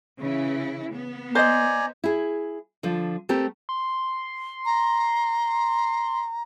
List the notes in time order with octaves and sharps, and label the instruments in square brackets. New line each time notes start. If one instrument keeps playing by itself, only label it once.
[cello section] C#3 E3 E4
B3
[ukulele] C5 D#5 [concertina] D5 G#5 A#5
[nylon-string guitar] E4 G#4
D3 F3
A3 C4 G4 A#4
[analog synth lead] C6
[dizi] A#5